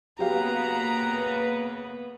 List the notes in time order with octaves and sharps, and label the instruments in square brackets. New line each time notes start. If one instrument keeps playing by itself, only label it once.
[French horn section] C#3 B4 [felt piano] F#3 G4 F5 [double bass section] A#3 B3 [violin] A#5